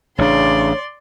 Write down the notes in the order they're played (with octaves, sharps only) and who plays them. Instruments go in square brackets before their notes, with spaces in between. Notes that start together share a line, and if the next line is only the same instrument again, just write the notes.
[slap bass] A1 D4 [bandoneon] C#3 [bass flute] C#5 [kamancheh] D5 C6